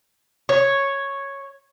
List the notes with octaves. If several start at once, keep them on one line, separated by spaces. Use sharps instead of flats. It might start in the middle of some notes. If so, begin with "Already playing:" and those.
C#5